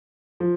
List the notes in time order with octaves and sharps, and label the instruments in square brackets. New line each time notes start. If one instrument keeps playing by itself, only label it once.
[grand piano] F3